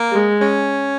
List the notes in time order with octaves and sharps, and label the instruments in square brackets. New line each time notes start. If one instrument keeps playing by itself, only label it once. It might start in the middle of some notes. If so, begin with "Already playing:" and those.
Already playing: [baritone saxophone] A#3
[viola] G#3
[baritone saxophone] C#4